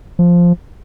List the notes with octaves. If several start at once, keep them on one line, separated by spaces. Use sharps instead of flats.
F3